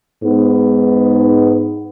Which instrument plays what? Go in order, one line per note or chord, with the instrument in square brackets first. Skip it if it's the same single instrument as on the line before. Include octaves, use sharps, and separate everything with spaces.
[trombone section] G#2 B3